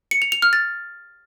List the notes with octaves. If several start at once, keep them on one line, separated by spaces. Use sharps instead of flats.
C#7
F7
F7
F6
A6